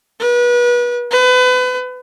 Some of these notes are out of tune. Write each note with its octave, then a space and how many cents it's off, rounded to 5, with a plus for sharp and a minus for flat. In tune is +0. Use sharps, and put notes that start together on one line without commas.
B4 -30
B4 +30